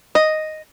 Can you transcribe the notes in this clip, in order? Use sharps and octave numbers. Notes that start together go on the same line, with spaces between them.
D#5